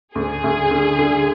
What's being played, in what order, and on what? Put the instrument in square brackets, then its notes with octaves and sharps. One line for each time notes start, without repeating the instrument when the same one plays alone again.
[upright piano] D2 [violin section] G#4
[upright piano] D2
D3
D3